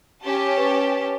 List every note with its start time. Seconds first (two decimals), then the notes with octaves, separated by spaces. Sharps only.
0.24 C#4 G4 A5
0.57 B4 C#5 C#6